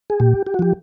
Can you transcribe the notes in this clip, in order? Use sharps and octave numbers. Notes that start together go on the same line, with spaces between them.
G#4
A#2 G4
G4
F#4
F3 G4